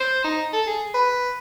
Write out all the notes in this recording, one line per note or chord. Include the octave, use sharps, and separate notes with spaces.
C5
D#4
A4
G#4
B4